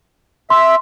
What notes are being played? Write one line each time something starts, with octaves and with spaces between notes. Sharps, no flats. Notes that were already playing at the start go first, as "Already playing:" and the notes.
E5 C6